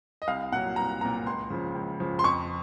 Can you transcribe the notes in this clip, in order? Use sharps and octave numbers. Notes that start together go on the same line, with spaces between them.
D#5
C2 F5
A#2 F#3 F#5
C2 A#5
A#2 F#3 A#5
C#2 C6
C#3 F3
C#2
C#3 F3
C6
F2 C#6